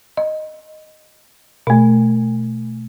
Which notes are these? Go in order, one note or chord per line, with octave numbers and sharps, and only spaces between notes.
D#5
B2 A3